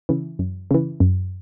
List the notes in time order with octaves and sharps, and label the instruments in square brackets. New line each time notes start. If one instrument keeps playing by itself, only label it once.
[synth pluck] C#3 E3
F#2
C#3 E3
F#2